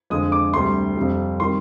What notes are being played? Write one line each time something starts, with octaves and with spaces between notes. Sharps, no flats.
F2 D3 G#3 D#6
D6
D2 C3 G3 C6
F2 C3 G3
D#3 G3 C6